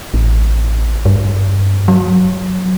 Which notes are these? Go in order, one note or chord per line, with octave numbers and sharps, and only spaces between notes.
A1
G2
F#3